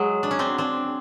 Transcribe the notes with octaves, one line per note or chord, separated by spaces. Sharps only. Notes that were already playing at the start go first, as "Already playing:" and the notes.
Already playing: F#3 G#3
D4
C#4
C4 D4
C4 D4